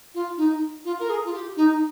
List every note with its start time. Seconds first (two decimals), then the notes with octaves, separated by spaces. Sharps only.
0.14 F4
0.37 D#4
0.84 F4
0.99 A#4
1.09 G#4
1.24 F4
1.33 G4
1.56 D#4